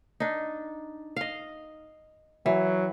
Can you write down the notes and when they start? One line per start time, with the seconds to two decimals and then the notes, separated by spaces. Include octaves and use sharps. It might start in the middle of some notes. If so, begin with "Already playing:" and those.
0.20 D4 D#4
1.16 D#5 F5
2.46 E3 F#3